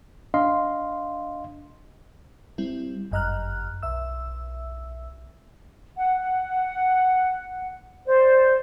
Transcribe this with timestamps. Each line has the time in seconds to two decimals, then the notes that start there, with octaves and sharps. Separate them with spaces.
0.34 D4 D#5 F5 C6
2.58 G3 C4 E4
3.11 G1 F#2 D#5 A#5 F6 F#6
3.83 B1 E5 E6
5.97 F#5
6.18 F#5
8.06 C5 D5